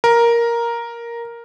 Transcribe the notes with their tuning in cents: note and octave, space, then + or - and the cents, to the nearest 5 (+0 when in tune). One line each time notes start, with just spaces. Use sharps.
A#4 +5